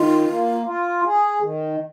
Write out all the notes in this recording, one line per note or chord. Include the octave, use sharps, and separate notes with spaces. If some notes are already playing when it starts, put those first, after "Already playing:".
Already playing: D#3 F4
A#3
F4
G#4
D#3